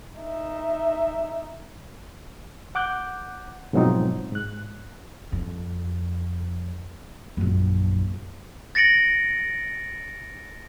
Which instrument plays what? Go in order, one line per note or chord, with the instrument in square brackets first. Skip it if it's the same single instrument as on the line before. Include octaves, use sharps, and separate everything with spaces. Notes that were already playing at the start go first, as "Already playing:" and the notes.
[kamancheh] D#4 E5
[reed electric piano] F#5 D6 F#6 G6
G#2 B2 F3 F#3 C4 D#4
G#2 F#6
[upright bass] F2
A#1 F#2
[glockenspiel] A6 A#6 C#7 D7 F#7